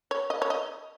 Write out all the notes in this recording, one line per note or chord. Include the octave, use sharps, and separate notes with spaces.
C#5
D#5
C#5
D#5